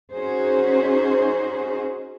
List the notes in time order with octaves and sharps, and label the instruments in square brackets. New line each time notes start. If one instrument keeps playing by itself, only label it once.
[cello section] C#4 D#4 F#4 G#4 C5